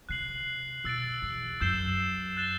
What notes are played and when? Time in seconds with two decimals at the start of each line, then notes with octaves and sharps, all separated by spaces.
0.09 C3 F#6 C7 F#7
0.84 B2 E6 A6 D7
1.22 E2
1.61 F#2 E6 G6 C7 E7 G7
2.37 F#6 A6 E7 G7